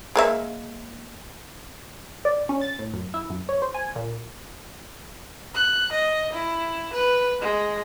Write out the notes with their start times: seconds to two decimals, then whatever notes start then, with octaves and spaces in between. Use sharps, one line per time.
0.16 G#3 A#3 E5
2.25 D5
2.49 C#4
2.61 A6
2.79 A2
2.93 F#2
3.14 E4
3.30 F#2
3.49 C#5
3.62 C5
3.74 G#5
3.96 A#2
5.55 F#6
5.92 D#5
6.33 E4
6.93 B4
7.41 G#3